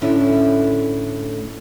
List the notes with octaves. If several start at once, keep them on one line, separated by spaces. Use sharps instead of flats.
A2 D3 A3 C#4 D4 E4